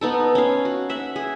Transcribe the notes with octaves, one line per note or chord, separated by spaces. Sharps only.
B3 D#4 A4
C#4 F5
F#4
E5 F#5
G#4